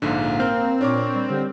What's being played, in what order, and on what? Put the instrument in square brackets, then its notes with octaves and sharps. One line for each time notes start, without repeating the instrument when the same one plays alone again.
[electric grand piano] A#1 G#2 D3 [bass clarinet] A#3
[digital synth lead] C4 [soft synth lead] A#4 [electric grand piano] F6
[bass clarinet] A#2 [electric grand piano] D4 A#4 D6 [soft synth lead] C#5
[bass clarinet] G3
[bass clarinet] D3 [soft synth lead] G3